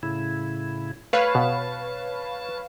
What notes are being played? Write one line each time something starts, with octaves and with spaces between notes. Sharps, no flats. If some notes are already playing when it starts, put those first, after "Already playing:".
A2 C#3 E4
A3 B4 C#5 F5 A5
B2